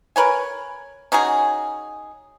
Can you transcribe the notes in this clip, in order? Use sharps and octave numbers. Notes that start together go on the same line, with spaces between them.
A#4 B4 C#5 G#5
C#4 D#4 F#4 G#4